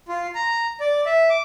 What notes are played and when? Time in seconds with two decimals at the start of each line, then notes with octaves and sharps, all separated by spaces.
0.08 F4
0.35 A#5
0.80 D5
1.06 E5
1.30 D6